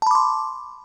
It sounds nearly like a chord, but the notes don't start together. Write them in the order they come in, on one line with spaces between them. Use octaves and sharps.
A5 B5 D6 C6